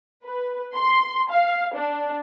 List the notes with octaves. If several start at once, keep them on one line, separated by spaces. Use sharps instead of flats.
B4
C6
F5
D4